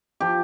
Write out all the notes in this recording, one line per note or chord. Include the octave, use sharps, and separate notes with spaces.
F3 G4